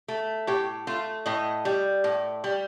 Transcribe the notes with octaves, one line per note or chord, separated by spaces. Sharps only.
A3
A2 G4
A3 F4
A2 D#5
G3
A2
G3